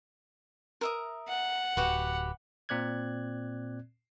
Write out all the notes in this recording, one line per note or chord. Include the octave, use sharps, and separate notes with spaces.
A#4 E5 D#6
F#5
D1 F#4 G4 B4
A#2 C4 D5 F#6 G#6